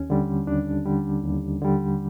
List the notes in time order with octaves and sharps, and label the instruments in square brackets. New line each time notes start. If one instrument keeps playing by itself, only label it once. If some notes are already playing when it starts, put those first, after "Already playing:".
Already playing: [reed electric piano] D#2 C#4
D3 G3
D#2 D4
D3 G3
D#2
D3 G3